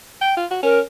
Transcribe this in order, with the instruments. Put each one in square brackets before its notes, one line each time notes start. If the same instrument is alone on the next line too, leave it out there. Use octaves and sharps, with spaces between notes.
[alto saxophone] G5
F4
F#4
[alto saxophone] C#4 [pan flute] A#4